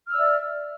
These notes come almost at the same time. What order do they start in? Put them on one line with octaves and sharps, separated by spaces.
F6 E6 D5 E5